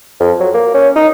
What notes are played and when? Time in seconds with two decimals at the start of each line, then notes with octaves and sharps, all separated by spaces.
0.20 F2
0.40 F#3
0.54 A#3
0.74 C#4
0.96 D#4